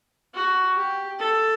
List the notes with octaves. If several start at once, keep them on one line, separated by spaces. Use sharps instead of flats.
F#4
G4
A4